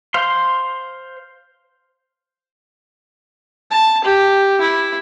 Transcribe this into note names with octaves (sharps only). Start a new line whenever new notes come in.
C5 F5 C6
A5
G4
E4